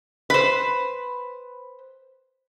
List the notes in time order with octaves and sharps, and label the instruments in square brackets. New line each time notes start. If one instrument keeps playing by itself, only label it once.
[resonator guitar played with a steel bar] B4 C5